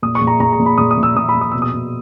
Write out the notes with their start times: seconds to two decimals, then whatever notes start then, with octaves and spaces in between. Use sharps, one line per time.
0.02 A#2 D#6
0.15 C#6
0.21 A#2
0.27 A#5
0.40 A#2 A#5
0.52 A#5
0.59 A#2
0.66 B5
0.78 A#2 D#6
0.91 D#6
0.97 A#2
1.03 E6
1.16 A#2 D#6
1.29 B5
1.34 A#2
1.41 D#6
1.52 B2 E6
1.62 D#6
1.73 B2